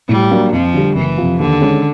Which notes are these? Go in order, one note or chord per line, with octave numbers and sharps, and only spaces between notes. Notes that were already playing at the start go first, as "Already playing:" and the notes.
A2 G3
F#3 A#3 D4
F2 F3
D3 G3
F#1 E3
F2 C3 F3
D#2 D3
D#3 G#3 C#4